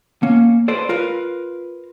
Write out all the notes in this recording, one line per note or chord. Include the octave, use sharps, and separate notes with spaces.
A#3 C#4
A4 B4 C5 D5
F4 A#4 B4